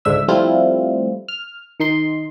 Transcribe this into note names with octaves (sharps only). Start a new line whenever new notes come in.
C#2 G#2 D3 E5 E6
F3 G3 A3 C4 E4 F4
F6
D#3 D#4 C6